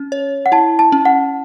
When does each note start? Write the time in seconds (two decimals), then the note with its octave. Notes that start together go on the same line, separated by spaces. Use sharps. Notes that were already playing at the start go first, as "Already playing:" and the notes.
Already playing: C#4
0.12 C#5
0.46 F#5
0.52 E4 A5
0.79 A5
0.92 C#4
1.05 F#5